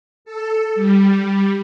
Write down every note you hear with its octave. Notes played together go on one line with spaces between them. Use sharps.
A4
G3